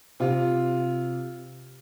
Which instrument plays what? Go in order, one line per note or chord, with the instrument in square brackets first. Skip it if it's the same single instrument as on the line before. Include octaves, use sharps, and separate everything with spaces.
[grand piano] C3 F4